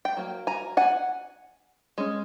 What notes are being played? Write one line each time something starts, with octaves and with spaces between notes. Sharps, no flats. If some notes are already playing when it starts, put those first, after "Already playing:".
G5
F#3 A#3
G#5 A#5
F#5 G#5
G#3 C#4